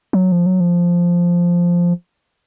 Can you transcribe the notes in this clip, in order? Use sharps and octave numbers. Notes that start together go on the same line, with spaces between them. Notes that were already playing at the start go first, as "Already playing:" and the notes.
F#3
F3
F#3
F3